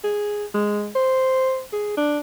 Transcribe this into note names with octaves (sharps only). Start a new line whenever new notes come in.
G#4
G#3
C5
G#4
D4